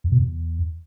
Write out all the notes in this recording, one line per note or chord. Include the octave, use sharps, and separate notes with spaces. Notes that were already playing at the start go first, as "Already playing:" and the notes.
E2
B2
E2